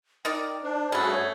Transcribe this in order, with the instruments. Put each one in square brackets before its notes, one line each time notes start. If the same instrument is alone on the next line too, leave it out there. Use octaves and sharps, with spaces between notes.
[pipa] D#4 A#4 D5 [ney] G5
[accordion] D4 [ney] C5
[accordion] G2 F#4 G#4 [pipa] A3 C#4 [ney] B5
[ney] C#5